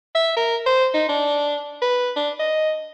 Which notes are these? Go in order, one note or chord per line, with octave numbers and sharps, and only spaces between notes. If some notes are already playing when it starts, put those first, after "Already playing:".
E5
A#4
C5
D#4
D4
B4
D4
D#5